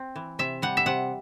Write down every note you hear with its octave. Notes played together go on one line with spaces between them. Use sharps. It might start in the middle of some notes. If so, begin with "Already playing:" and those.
Already playing: C4
E3
C3 E5
G3 F#5
E5
C3 F#5